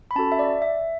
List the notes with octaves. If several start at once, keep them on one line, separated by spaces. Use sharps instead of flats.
B5
C#4 F#4 A4 A5
E5
D5
E5